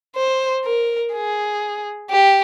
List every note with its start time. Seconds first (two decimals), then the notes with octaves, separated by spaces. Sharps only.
0.16 C5
0.65 A#4
1.14 G#4
2.11 G4